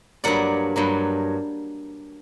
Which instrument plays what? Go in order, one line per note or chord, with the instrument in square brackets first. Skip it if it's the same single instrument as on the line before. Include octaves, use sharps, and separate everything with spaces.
[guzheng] G2 F#3 A#3 D5 F#5
G2 F#3 A#3